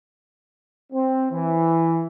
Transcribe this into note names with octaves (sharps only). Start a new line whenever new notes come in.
C4
E3